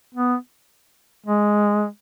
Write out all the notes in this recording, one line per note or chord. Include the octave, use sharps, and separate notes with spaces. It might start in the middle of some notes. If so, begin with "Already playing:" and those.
B3
G#3